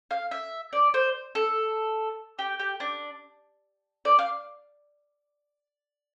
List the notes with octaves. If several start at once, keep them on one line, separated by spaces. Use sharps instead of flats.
F5
E5
D5
C5
A4
G4
G4
D4
D5
F5